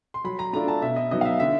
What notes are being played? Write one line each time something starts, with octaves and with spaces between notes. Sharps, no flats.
C6
F#3 B5
A#5
A3 D4 F4 A#5
A5
B2 E5
D#5
F#3 B3 D#4 D#5
F5
E5
D3 E5